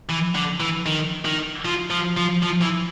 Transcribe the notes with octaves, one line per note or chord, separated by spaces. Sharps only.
E3
D3
E3
D#3
D#3
F3
F3
F3
F3
E3